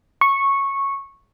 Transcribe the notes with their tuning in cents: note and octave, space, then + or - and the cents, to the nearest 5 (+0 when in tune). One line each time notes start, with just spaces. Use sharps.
C#6 -10